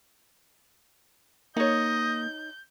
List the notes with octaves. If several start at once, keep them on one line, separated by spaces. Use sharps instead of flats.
A#3 D#4 C#5 D#5 G6